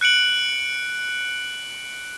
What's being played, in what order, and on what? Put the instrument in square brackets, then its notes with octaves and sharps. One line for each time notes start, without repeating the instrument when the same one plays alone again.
[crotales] F#6 C#7 D7 F#7